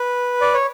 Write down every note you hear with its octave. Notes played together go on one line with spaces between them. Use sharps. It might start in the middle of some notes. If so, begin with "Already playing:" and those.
Already playing: B4
D5
C#5